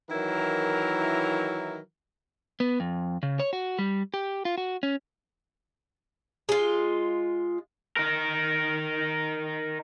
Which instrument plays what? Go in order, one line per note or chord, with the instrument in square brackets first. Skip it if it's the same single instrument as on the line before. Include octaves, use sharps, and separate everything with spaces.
[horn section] D#3 E3 F#3 E4 A#4
[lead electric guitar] B3
F2
C#3
C#5
F#4
G3
G4
F4
F#4
C#4
[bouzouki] G#3 F4
[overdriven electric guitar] D#4 A#4